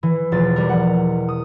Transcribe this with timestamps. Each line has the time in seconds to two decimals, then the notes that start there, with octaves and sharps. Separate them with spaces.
0.03 E3
0.32 E1 F3 A6
0.56 G3 A#4
0.69 F#5
1.29 D#6